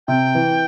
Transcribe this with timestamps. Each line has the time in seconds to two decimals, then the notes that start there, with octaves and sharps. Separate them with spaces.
0.08 C3 G5
0.35 E3